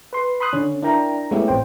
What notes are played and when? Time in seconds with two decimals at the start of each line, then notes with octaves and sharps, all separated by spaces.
0.13 B4 C6
0.40 B5 C6 D#6 F#6
0.53 D3 C#4
0.83 D4 E4 A#4 G5 A#5
1.31 G#3 A3 B3 C#4 E4 G4
1.48 A1 C4 C5 G5